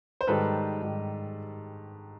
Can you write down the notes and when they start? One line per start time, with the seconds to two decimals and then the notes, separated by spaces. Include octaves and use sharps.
0.21 C5
0.27 G#2 D#3 G3 A4 B4
0.82 G#2 D#3 G3